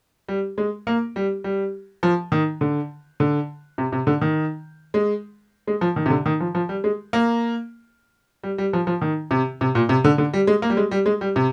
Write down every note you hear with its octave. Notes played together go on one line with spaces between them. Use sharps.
G3
G#3
A#3
G3
G3
F3
D#3
D3
D3
C3
C3
D3
D#3
G#3
G#3
F3
D#3
C3
D3
D#3
F3
F3
G3
G#3
A#3
G3
G3
F3
F3
D#3
C3
C3
A#2
C3
D3
D3
G3
G#3
A#3
G3
G#3
G3
G#3
G3
C3